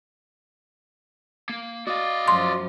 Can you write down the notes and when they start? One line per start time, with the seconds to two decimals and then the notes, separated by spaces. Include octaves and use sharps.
1.49 A#3
1.87 F#4 D5 D#5 F5
2.28 F#2 F3 C6